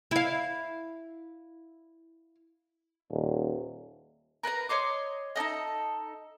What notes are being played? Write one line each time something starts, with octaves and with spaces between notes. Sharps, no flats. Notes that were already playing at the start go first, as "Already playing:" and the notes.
E4 F5
D#1
A#4 B4 A5 A#5
C#5 D#5 C6 D6
D#4 A4 D5 D#5